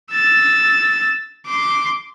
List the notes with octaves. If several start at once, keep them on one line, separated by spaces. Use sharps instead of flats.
E6 A6
C6 D6